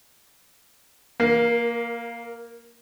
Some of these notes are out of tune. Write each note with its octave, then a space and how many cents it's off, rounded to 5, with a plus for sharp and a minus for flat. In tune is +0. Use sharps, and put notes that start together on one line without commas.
A#3 +0 A#4 +25